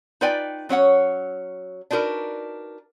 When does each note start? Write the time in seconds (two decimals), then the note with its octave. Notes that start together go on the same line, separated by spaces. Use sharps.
0.21 D#4 F4 B4 D5 G5 G#5
0.69 F#3 C#4 C#5 F#5
1.91 D4 D#4 F#4 A#4 B4